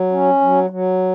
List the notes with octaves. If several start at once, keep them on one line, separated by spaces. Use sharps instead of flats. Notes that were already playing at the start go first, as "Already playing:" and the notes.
Already playing: F#3
C#4
F#3
F#3